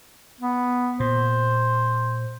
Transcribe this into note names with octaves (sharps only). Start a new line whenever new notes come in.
B3
A#2 C5